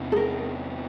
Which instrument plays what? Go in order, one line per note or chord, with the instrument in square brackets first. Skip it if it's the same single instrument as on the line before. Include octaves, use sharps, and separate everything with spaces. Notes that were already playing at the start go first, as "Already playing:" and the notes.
Already playing: [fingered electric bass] E2 C3 E3
[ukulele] A4
A#4